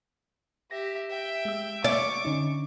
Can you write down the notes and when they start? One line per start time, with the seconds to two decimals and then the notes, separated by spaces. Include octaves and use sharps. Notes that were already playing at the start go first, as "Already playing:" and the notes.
0.71 G4 E5 A#6
1.10 E5 G5
1.45 G#3 E6
1.84 D5 C#6 D6
2.25 D3 C#4 D#4